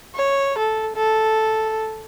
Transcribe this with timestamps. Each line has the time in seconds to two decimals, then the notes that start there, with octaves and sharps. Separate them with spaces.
0.15 C#5
0.58 A4
0.96 A4